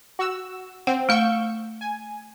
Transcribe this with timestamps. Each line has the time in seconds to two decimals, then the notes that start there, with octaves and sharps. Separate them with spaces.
0.19 F#4 E6
0.87 C4 F#5 G5
1.09 A3 F5 C#6 E6 G6
1.81 G#5